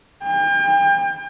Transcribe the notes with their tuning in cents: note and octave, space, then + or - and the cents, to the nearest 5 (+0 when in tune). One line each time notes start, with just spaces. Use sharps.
G5 +35